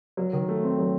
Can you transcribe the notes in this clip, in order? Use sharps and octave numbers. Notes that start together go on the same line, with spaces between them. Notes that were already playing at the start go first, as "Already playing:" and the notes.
F#3
D#3
A3
C4
F#3